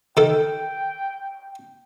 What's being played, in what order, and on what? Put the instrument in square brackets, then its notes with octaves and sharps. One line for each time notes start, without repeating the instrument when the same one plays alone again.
[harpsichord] D#3 A4 [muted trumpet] G5